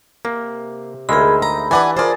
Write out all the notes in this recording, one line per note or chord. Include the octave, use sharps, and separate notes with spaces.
C3 A#3
D2 G#3 D#4 G#4 A#4 E5 B5
A#5 B5
E3 D4 G4 B4 F#5 G#5
F4 G#4 A#4 C5 D5